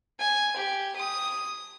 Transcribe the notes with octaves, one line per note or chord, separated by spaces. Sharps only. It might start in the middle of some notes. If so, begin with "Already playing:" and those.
G#5
G4
D#6